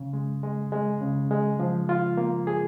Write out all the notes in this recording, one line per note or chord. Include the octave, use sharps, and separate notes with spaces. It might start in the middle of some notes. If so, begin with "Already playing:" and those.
Already playing: C#3
G#3
G#3
G#3
C#3
G#3
F3
F4
A#3
G#4